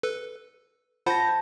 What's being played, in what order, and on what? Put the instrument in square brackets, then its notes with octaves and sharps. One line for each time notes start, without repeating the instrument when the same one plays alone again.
[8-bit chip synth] A4 B4
[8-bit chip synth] F4 C5 F#5 [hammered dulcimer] A5 [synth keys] B5 G6 A#6